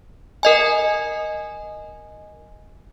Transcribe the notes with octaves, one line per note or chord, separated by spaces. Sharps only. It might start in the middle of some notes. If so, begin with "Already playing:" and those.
A#4 D#5 G#5